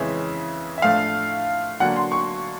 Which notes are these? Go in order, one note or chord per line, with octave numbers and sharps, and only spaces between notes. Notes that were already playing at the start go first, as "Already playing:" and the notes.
Already playing: F2 C#3 E3 G#3 C#4 E5
E5
A2 F3 A3 D4 F5
D3 F#3 A#3 D4 F#5
C6
C#6